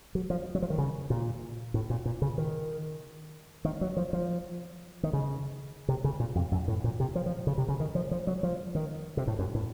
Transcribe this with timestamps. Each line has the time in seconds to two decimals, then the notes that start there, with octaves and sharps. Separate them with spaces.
0.15 F#3
0.30 F3
0.55 F#3
0.62 F3
0.70 D#3
0.78 C#3
1.10 A#2
1.74 A2
1.90 A#2
2.05 A#2
2.22 C#3
2.38 D#3
3.65 D#3
3.81 F#3
3.97 F3
4.13 F3
5.03 D#3
5.13 C#3
5.88 C3
6.04 C#3
6.20 A#2
6.35 F2
6.51 F#2
6.68 A2
6.84 A#2
7.00 C3
7.15 F3
7.26 F3
7.47 C#3
7.58 C3
7.68 C#3
7.80 D#3
7.95 F3
8.11 F3
8.27 F#3
8.43 F3
8.75 D#3
9.17 C3
9.27 A2
9.39 F#2
9.55 A2